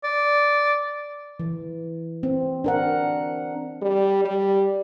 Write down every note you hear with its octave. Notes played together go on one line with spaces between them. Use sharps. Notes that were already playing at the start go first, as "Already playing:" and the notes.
D5
E3
C4
D4 A#4 F#5
G3
G3